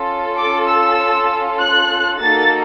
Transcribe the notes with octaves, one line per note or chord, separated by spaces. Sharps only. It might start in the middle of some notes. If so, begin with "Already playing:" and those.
Already playing: C#4 F4 A4
D6
E6
F#6
A#3 D#4 F#4 A4 A6